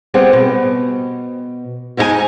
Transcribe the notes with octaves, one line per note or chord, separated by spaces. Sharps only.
G3 B3 C4 G#4 F#5
B2
F2 G#3 D#4 E4 G#5